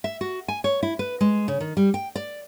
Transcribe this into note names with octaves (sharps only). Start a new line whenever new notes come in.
E5
F#4
G#5
C#5
E4
B4
G#3
C#3
D#3
G3
G5
D5